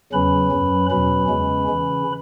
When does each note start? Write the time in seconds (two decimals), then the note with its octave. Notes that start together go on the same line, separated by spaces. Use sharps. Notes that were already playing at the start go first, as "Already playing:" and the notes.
0.12 E2 C#3 F#3 C#4 B4 B5
0.52 F#2 F#3 C#4
0.90 E2 B2 F#3 C#4 B4 B5
1.28 E2 C#3 G#3 C#4
1.68 C#3 E3 C#4